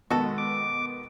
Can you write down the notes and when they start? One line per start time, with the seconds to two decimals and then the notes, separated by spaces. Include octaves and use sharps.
0.10 B2 D#3 G#3 B3 F#4 A4
0.38 D6